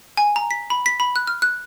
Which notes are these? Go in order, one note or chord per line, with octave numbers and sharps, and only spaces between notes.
G#5
A#5
B6
B5
B6
B5
F#6
F6
F#6